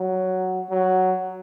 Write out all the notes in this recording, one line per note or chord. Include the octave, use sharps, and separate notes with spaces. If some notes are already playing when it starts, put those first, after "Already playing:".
Already playing: F#3
F#3